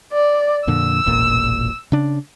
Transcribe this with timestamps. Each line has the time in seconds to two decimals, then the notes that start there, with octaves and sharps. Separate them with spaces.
0.13 D5
0.67 F2 A#2 D3 E6
1.06 E1 A1 A#2
1.92 C#3 D4